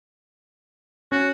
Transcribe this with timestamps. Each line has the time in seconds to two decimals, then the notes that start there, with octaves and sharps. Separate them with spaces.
1.12 C#4 F#4